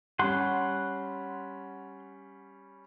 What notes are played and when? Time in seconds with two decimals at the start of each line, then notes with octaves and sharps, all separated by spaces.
0.19 G3 C#4 F#5 C6